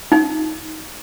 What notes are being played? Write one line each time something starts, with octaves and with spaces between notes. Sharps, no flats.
D#4